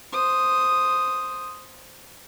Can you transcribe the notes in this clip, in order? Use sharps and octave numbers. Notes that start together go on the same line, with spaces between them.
C5 D#6